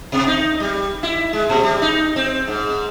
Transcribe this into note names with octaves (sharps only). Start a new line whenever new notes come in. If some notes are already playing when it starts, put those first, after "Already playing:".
B2
D#4
G3
E4
G#3
A#2
G3
D#4
C4
G#2